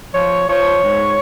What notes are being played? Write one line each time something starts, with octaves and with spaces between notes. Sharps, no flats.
F3 C#5
F3 C#5
G#2